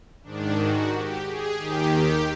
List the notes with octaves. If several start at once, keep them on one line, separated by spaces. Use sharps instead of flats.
G#2 D#3 D4
F#4
G4
G#4
D#2 D#3 G4
G4